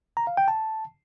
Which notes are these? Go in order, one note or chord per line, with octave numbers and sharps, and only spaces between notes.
A#5
F5
G5
A5